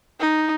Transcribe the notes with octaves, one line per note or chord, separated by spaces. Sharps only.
D#4